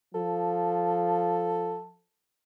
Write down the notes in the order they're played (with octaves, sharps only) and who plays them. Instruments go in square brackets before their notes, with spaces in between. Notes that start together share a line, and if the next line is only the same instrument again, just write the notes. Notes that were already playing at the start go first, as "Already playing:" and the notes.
[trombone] F3 [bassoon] A4